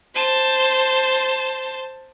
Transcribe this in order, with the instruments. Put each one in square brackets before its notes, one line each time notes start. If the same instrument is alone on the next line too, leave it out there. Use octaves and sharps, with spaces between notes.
[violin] C5 A5